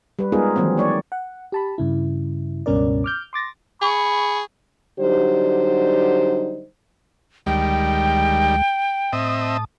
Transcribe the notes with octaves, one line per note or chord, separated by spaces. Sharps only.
G3 B4
G#3 B3 D#4 F4 G#4 A#4
D#3 E3 F#3 A#3 C4
A#3 C#5 D5
F#5
G4 A5 B5
G2 C#3 E4
C#2 G2 B2 C#4 A#4 D5
D6 F6 G6
C6 D6 A6 A#6
G#4 B5 C#6
D3 F#3 G3 D#4 G4 C5
D2 D#3 G3 G#3 G5
A2 C4 D#5 E5 A5 D#6